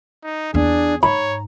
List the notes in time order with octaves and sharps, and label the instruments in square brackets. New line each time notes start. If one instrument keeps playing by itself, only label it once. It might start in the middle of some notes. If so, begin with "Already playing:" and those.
[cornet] D#4
[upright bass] E2 B3 [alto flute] D4 [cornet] G#4
[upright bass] G#2 [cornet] C#5 [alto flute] A#5 [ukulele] B5